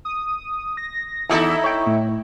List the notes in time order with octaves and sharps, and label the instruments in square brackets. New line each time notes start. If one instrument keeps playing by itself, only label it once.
[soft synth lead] D#6
A#6
[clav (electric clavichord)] E2 [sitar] D#4 E4 A4
[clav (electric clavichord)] C#5 G5
[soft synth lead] A2